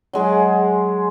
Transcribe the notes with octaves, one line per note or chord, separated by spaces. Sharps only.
F#3 G#3 G#4